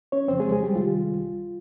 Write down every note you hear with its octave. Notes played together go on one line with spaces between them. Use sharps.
C#4 C#5
F2 C#3 F3 C4 C5
G#3 G#4
G#3 G#4
G3 G4
C2 C3 D#3 G3 F4